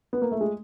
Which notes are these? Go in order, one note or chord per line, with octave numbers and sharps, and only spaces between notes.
B3
A#3
A3
G#3